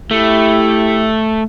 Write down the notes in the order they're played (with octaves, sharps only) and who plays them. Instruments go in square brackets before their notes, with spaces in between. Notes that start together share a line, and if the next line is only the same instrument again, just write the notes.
[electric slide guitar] A3 [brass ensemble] E4 G4